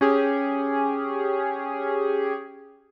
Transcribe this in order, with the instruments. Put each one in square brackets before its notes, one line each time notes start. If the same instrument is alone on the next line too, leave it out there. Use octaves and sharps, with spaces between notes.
[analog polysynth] C#4 G4 G#4